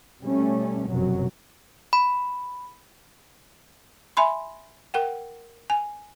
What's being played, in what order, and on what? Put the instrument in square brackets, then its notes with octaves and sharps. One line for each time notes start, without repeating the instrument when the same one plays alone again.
[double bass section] B2 G3 A3 C#4
F1 F#2 B2 F#3
[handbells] B5
[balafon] E5 G#5 B5 C6
A#4 F#5 G5
G#5